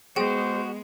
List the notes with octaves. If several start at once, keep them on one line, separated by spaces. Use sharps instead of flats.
G#3 B3 F#4 G#4 C5 G5